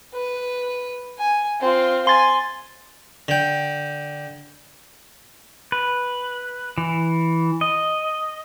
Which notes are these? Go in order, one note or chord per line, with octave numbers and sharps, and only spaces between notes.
B4
G#5
C4 F4
G#5 C6 A6
D3 G5
B4
E3
D#5